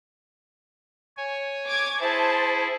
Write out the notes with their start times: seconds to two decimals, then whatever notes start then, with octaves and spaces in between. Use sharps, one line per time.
1.17 C#5 G#5
1.66 D6 G#6
2.01 E4 G#4 C5 A5